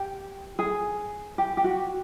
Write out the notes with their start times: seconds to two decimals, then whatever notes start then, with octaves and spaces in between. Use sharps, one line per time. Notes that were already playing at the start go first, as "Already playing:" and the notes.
Already playing: G4
0.59 G#4
1.38 G4
1.57 G4
1.64 F#4